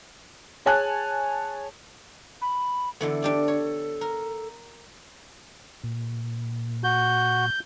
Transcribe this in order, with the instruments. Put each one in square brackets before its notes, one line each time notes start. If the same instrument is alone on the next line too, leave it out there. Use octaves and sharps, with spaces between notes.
[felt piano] G#4 C#5 G#5 A5 F#6
[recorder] B5
[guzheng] D3 E3 B3 [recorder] A4
[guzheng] D4 G4 D5
C#5
A#4
[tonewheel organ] A#2
[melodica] F#4 [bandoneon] G6